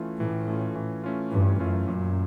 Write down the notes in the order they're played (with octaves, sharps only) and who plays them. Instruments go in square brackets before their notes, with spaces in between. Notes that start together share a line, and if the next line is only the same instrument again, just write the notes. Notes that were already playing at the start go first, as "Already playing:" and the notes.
Already playing: [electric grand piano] E3 A3 C#4 F4
[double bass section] A2 [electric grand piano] E3
[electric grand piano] A3 C#4 F4
E3
A3 C#4 F4
[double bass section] G2 [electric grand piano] E3
[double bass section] F#2 [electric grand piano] A3 C#4 F4
[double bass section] F#2 [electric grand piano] A#2